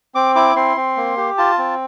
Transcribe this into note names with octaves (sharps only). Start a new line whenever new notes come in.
C4 D6
E4 D6
C4 C6
C4
A#3
G4
F4 A5
C4